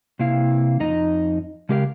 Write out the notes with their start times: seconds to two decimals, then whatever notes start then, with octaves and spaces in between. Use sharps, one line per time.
0.19 C3 A#3 E4 F5
0.80 F2 D#4 D#5 A#5
1.69 C#3 G#3 G4 A#4 D#5 F5